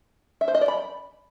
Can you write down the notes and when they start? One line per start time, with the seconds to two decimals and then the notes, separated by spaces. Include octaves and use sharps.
0.41 E5
0.48 C5
0.55 D#5
0.61 D5
0.68 B5